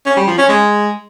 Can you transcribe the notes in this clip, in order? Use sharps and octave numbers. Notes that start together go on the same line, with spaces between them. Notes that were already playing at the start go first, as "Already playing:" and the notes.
C#4
G3
F3
C#4
G#3